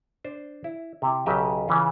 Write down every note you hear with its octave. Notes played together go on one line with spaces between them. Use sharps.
D4 C5
E4
C3 E4
B1 C#3 F#3 G4 D#5 E5
C#3 E3 C#4 F4